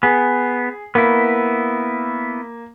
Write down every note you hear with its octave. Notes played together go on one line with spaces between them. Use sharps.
B3 G#4
A#3 B3 E4